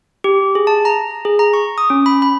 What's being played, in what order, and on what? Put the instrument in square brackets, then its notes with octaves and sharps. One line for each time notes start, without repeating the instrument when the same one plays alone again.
[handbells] G4
G#4
A5
A#5
G#4
A#5
C#6
D#6
C#4
B5
B5